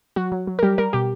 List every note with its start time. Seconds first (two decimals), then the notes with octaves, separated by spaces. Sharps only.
0.16 F#3 F#4
0.32 F#3
0.47 F#3
0.59 A#4
0.63 G3 G4
0.78 G3 A#4
0.93 B2 G4